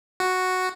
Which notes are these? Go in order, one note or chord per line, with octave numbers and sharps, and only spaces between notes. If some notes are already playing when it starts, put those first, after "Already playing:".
F#4